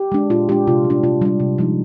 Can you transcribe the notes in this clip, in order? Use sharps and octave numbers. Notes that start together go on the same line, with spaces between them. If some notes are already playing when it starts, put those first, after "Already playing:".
Already playing: G4
G#3 D4
A#2 F4
G#3 D4 G4
C3 F4
G3
D4
C3 F4
G3 D4
C3
F3 G#3 D#4